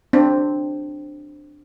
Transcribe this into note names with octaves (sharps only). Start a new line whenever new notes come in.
C4 D4